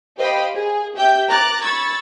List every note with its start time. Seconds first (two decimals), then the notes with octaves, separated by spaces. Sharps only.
0.17 G4 C5 D#5 F5 G5 B5
0.54 G#4
0.95 G4 E5 G5 G6
1.30 A#5 D6 F#6 A6
1.62 B5 C#6 E6 G#6 A6